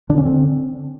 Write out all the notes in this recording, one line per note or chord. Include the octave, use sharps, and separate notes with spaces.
D3 D4
C#4
D3 C4